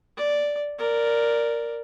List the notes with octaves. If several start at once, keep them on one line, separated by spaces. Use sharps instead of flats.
D5
A#4 D5